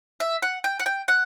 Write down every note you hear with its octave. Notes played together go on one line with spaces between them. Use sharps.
E5
F#5
G5
F#5
G5
F#5